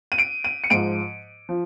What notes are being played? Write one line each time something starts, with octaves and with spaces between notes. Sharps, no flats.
D#7
D7
D#7
C#7
G#2 F3 D7
F3